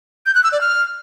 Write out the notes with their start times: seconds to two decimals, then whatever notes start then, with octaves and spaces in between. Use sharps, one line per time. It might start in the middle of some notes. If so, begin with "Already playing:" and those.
0.26 G6
0.35 F#6
0.43 E6
0.52 D5
0.61 F6